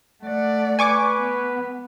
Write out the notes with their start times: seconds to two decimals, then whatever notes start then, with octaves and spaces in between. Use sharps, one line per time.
0.23 A3 D5 F#5
0.79 B4 G#5 C#6 D6
1.19 B3